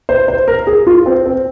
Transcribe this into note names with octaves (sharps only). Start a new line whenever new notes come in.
C5
C5
A#4
G#4
F4
C4
C4